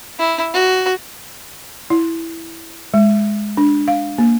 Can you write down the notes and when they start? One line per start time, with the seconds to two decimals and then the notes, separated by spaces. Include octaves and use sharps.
0.19 E4
0.54 F#4
1.90 E4
2.94 G#3
3.57 D4
3.88 F5
4.18 A#3